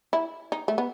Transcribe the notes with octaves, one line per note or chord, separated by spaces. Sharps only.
E4
D#4
A3
B3